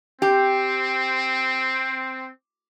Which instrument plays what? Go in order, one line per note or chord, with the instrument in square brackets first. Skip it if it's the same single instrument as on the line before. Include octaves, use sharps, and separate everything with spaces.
[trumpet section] C4 [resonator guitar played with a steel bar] G4